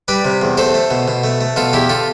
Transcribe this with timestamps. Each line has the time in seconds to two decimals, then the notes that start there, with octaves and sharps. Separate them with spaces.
0.08 G3 B4 D5
0.25 C3
0.41 E2
0.57 A3 A4 C5
0.74 A3
0.91 B2
1.08 B2
1.24 A3
1.41 A3
1.56 B2 F4 A4
1.73 E2 E4 G4
1.89 F4 A4